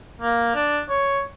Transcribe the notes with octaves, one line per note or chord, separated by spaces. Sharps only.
A#3
D4
C#5